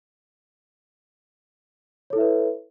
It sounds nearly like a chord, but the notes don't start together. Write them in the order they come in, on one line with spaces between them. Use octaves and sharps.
C#5 A4 E4 E5 B4